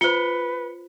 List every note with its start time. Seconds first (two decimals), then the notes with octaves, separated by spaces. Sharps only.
0.01 F4 B4 C5 C#7 G7